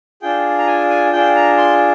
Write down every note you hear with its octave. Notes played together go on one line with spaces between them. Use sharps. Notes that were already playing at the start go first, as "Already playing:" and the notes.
D4 F4 G#4 G5
A#5
G#5
G#5
D4 F4 G#4 G5
A#5
C6